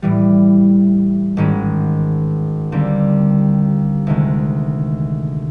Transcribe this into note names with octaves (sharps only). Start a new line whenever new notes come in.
A2 E3 G3
G#1 G#2 D#3 G#3 C#4
D#2 D3 G3 C4
D2 C3 D#3 G#3